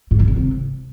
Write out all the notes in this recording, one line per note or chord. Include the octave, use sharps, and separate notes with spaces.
G#2
D#3
C#3
C3